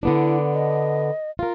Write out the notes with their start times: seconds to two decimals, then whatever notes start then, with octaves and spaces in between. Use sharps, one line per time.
0.03 D3 B3 D4 E4
0.54 D#5
1.39 F4 A#4